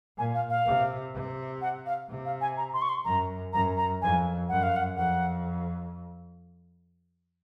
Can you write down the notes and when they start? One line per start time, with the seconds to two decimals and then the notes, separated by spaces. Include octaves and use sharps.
0.18 A#2 G#5
0.35 F5
0.50 F5
0.66 C3
1.14 C3
1.61 F#5
1.86 F5
2.09 C3
2.26 F5
2.41 G#5
2.57 A#5
2.74 C6
2.82 C#6
2.89 C6
3.05 F#2 A#5
3.53 F#2 A#5
3.77 A#5
4.02 F2 G#5
4.49 F#2 F#5
4.63 F5
4.76 F#5
4.97 F2 F#5